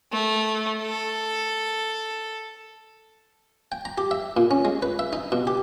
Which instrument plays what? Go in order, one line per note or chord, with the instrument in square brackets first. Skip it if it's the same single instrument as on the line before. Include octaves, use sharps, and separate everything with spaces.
[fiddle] A3
A4
[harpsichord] G5
A#5
G4
E5
A#2
C#4
G#3
B4
E5
D#4
B2
G4